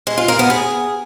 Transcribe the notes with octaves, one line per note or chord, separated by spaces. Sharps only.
G#3
F4
A#4
B3
G#4